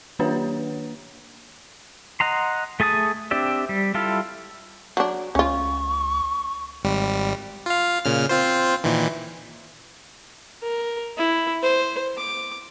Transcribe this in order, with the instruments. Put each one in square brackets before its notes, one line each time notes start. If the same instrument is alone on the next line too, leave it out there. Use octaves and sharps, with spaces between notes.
[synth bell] D#3 A#3 D4 G4 B4 C#5
[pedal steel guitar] D#5 F#5 A#5 C6
A3 G#4 A5 B5 D#6
C4 D4 G4 D5 E5
G3
G3 E4 F4 A4 F5
[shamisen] F#3 D4
[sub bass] C#2 [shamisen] C#4 F4 [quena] C#6
[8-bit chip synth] G#1 G3
F4 F5
A#2 C#3 F6
C4 F4 C5
A#2 D#3 E3
[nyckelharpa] A#4
E4
C5
D6